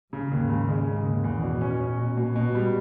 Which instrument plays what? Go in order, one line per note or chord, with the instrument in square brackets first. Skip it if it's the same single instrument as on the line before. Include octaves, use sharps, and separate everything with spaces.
[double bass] G#2 [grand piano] C#3
[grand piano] D#2
C#3
G#3
C#3
D#2
[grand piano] E2 [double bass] A#2
[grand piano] B2
C#4
C#4
B2
B2
B2
G3